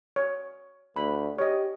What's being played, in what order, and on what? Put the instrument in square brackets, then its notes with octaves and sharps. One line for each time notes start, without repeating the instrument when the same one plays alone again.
[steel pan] C#5
[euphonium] D2 [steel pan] B5
[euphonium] G4 [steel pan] C#5 D#5